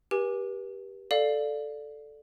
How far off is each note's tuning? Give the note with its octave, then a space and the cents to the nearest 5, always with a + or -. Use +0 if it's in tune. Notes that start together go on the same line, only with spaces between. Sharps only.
G4 +0 B4 -45 G#5 -10
A4 +0 D5 +0 F5 +0